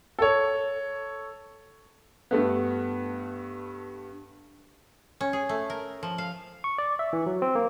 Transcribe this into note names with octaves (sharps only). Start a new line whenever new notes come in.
A4 C#5
G2 A3 B3
C#4
G#4
A3
A#4
F3
F5
C#6
D5
E5
E3
F#3
C4
A#3